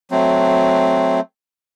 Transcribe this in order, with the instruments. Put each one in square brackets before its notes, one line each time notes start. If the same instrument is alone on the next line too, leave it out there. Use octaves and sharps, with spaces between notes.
[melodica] F#3 A3 C4